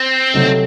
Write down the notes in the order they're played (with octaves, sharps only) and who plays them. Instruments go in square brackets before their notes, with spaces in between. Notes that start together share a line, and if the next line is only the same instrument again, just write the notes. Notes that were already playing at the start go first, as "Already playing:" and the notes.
Already playing: [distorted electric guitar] C4
[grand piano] C3 F#3 A3 D#4